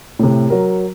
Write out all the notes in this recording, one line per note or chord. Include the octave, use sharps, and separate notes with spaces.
A2 C3
F#3 A#4